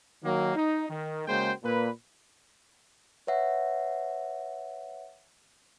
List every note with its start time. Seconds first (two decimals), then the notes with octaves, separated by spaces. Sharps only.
0.23 D#3 F#3 A#3
0.55 D#4
0.89 D#3
1.27 C#3 G#3 A#3 F#4 C5 G5
1.63 A#2 B4
3.27 B4 C#5 E5 F#5